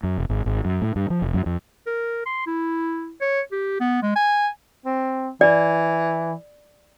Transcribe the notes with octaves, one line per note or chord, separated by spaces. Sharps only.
F#2
F1
G#1
G#1
F#2
A2
G2
F3
F1
F#2
F2
A#4
C6
E4
C#5
G4
B3
G#3
G#5
C4
E3 D5